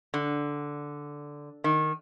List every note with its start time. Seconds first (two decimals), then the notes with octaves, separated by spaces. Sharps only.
0.14 D3
1.64 D#3